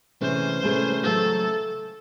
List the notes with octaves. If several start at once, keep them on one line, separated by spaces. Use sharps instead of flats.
C3 E3 A3 C#4 G#4 C5
C3 E3 A3 C#4 G#4
C#3 F#3 A3 A4